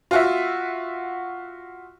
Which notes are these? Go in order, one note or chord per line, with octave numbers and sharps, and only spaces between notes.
F4 F#4 E5